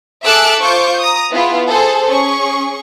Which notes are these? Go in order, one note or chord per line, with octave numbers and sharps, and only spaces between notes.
G#4 A4 E5 D6 E6 F#6
F4 C5 C#6 D6 G6
A#5 D#6
B3 E4 F4 G#4
G#4 A4 C5
C#4 G#4 C#6